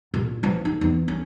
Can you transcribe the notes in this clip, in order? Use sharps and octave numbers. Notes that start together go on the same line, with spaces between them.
A#2
E3 F3
D#4
E2
C#4